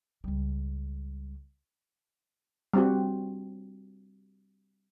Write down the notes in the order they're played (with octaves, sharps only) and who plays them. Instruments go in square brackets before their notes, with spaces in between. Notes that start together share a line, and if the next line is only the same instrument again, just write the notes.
[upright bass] C#2 G3
[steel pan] G3 C4 F#4